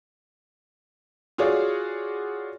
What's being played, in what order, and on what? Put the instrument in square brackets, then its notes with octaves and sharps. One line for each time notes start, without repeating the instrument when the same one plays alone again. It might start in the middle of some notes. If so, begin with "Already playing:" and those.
[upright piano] F4 F#4 G#4 C#5 D5